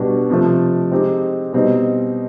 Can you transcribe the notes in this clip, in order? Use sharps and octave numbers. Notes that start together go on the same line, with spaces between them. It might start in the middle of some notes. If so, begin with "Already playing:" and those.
Already playing: B2 G3 B3 D4 F#4
C3 F3 A3
G#3 C4 D#4 G4
B2 G3 C4 D#4